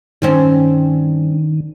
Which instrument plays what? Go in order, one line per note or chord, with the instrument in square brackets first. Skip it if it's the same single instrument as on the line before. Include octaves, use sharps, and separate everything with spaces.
[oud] G2 C4 C#4 [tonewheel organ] D#3